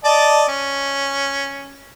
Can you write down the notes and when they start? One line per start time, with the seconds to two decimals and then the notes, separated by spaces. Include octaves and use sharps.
0.04 D5 D#5 A5
0.48 C#4